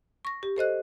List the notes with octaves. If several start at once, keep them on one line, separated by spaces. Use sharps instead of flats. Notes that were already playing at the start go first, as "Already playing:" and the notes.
C#6 A#6
G4
A4 C5 D#5 F#6